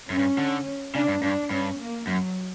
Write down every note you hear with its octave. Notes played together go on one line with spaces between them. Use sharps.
F#2 C#4
G2
D3
C#3 D4
G2
G2 D4
G2 C#4
A#3
F#2 F#3